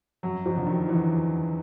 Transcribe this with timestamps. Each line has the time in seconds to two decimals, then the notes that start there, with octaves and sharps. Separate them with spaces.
0.23 F#2 F#3
0.46 F2 F3
0.57 D3
0.67 D#3
0.89 E2 E3